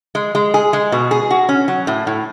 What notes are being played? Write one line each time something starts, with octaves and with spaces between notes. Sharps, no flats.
G#3
G#3
G#4
G#3
B2
G#4
F#4
C#4
F#3
A2
A2